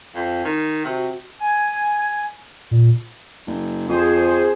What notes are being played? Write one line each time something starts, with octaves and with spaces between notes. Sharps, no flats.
F2
D#3
C3 F#4
G#5
A#2
F#1
F2 G#4 C5